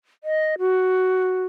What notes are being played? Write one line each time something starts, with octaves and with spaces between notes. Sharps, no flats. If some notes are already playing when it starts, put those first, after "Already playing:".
D#5
F#4